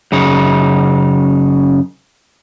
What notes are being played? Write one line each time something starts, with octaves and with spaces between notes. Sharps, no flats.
F#2 C#3 D#4